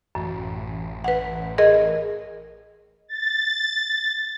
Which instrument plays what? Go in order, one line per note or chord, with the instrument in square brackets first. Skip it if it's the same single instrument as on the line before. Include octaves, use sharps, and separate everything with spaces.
[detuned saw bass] A1 [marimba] F#2
[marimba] B4 F#5
G#4 A#4 D#5
[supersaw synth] A6